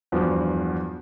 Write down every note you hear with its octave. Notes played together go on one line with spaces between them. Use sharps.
E2 G2 F3 F#3